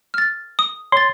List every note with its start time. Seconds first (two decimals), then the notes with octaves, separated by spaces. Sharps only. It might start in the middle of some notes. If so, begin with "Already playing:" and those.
0.14 F6 A6
0.59 D#6
0.92 C#5 C6 A6